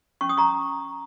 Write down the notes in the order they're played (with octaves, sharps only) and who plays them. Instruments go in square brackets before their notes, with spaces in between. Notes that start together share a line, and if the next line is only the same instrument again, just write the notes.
[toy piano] C#4 C#6
D#6
A#5 C#6